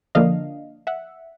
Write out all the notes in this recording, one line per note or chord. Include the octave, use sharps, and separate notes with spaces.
D3 F3 A#3 D4 D#5 F5
E5 F#5